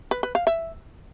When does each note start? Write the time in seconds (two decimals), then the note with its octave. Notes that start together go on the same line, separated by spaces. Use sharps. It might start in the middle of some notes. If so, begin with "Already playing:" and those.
0.11 B4
0.23 B4
0.35 F5
0.47 E5